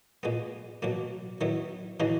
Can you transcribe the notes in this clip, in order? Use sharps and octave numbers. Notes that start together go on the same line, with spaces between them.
A#2 G#3 B3
B2 F#3 A#3
D#3 F#3 B3 E4
C#3 E3 G#3 D#4 F#4